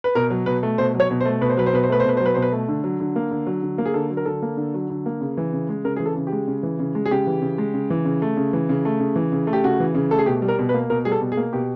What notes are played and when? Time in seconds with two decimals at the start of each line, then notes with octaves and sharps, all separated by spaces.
0.04 B4
0.15 B2 A#4
0.30 F#3
0.46 B2 B4
0.63 A3
0.78 B2 C5
0.95 F#3
1.00 C#5
1.11 B2
1.21 C5
1.25 A3
1.41 B2 B4
1.49 C5
1.57 F#3 B4
1.66 C5
1.73 B2 B4
1.83 C5
1.90 A3 B4
2.00 C5
2.05 B2 B4
2.17 F#3 C5
2.26 B4
2.34 B2 C5
2.42 B4
2.52 A3
2.68 D3
2.84 F#3
3.00 D3
3.16 A#3
3.31 D3
3.47 F#3
3.63 D3
3.78 A#3
3.86 G#4
3.94 D3 A4
4.10 F#3
4.17 A#4
4.26 D3 A4
4.42 A#3
4.57 D3
4.74 F#3
4.90 D3
5.06 A#3
5.21 C#3
5.37 E3
5.53 C#3
5.69 G#3
5.84 C#3 A#4
5.96 E3 G#4
6.06 A4
6.16 C#3
6.27 G4
6.32 G#3
6.48 C#3
6.63 E3
6.79 C#3
6.95 G#3
7.06 G#4
7.11 C#3 G4
7.27 E3
7.42 C#3
7.58 G#3
7.74 C#3
7.90 E3
8.05 C#3
8.22 A3
8.37 C#3
8.53 E3
8.69 C#3
8.85 A3
9.00 C#3
9.16 E3
9.32 C#3
9.47 A3
9.53 G4
9.64 C#3 F#4
9.80 E3
9.95 C#3
10.11 A3 A4
10.19 G#4
10.26 B2 G4
10.42 G3
10.48 A#4
10.59 B2
10.69 B4
10.74 A#3
10.90 B2 A#4
11.05 G3 G#4
11.12 A4
11.21 B2
11.32 G#4
11.37 A#3
11.53 B2 G4